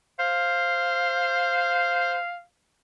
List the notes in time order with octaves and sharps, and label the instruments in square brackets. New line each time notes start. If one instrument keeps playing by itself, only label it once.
[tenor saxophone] C5 [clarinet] F5